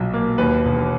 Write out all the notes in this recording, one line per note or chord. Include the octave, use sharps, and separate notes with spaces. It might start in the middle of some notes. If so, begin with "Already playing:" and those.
Already playing: B1 A#2 F#3
A#3
D#2 B4
E1